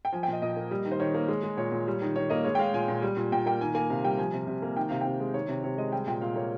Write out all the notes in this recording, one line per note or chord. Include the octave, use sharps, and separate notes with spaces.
G5
F3 G#5
G5
A#2 D#5
A#2 D#5
A#3
G3
D#3
C5
D#3 C#5
A#3
G#3
G#3
A#2 C#5
A#2
G3
D#3
D#3 C#5
A#3 D#5
G#3 C#5
G5
G#3 F5
A#2 G#5
A#2
G3
A#2
A#2 G5
A#3 G5
D#3 G#5
A#3 G#5
C3 F5
G3 G5
F3 G#5
C3
C3
A#3
D#3 G5
C3 F5
C3 G5
G#3
D#3 C#5
C3
C3 C#5
G#3 D#5
G3 G5
A#2 G5
A#2 F5
A#3 C#5